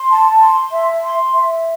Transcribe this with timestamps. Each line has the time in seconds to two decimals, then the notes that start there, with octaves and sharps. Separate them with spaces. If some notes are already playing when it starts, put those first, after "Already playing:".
Already playing: C6
0.10 A5
0.41 C6
0.72 E5
1.03 C6
1.34 E5